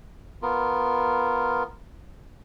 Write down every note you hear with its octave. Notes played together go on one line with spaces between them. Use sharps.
B3 F4 A#4